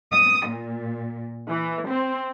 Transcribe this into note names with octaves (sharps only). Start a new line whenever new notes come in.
D#6
A#2
E3
C4